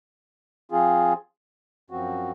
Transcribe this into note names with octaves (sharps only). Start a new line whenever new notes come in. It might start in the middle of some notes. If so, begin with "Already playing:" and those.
F3 C4 F4 G#4
F#2 F3 C4 F#4